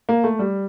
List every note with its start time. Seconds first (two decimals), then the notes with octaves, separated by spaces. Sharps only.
0.09 A#3
0.24 A3
0.39 G3